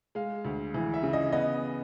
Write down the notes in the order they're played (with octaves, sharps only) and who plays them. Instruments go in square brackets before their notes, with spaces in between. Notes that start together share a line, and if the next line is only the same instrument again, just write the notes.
[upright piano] G#3 F5
D2
E3
E5
C#3
D#5
B3 D#5